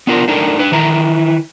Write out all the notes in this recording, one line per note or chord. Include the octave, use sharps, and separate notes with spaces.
B3 D4 F4 A#4
A3 D4 D#4 A#4
D4 B4
D#3 E3 E4 A#5